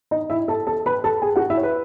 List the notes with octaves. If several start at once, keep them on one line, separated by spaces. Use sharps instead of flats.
D#4 D#5
E4 E5
A4 A5
A4 A5
B4 B5
A4 A5
G#4 G#5
F#4 F#5
E4 E5
C#5
B4